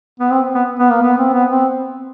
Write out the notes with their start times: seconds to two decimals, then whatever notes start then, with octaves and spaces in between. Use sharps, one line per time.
0.20 B3
0.31 C4
0.55 B3
0.79 B3
0.90 A#3
1.03 B3
1.18 C4
1.33 B3
1.49 C4